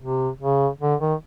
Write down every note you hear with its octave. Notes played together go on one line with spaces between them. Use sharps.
C3
C#3
D3
D#3